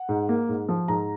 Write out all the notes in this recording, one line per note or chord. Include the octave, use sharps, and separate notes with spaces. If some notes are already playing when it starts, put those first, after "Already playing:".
Already playing: F#5
G#2
A#3
G#2
F3
G#2 A#5